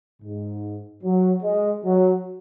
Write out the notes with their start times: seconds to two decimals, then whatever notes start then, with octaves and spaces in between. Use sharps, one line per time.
0.22 G#2
1.03 F#3
1.43 G#3
1.84 F#3